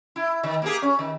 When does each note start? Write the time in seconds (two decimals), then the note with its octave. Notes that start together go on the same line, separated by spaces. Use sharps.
0.16 E4
0.43 D#3
0.62 A#3 G4 G#4
0.82 C#4
0.99 D#3